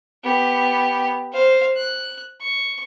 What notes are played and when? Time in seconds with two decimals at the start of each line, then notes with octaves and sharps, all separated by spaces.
0.24 B3 G4
1.32 C5 F5
1.76 F#6
2.40 C#6